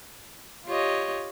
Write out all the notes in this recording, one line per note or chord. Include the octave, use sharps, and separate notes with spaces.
F4 G4 C#5 D#5